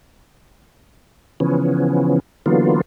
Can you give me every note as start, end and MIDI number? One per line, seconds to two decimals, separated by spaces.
1.40 2.19 49
1.40 2.19 52
1.40 2.19 53
1.40 2.19 59
1.40 2.19 61
2.46 2.81 50
2.46 2.81 52
2.46 2.81 54
2.46 2.81 58
2.46 2.81 59
2.46 2.81 65